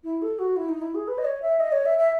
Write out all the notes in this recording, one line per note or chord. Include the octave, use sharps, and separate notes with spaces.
E4
A4
F#4
E4
D#4
E4
G#4
B4
D#5
C#5
E5
D#5
C#5
E5
E5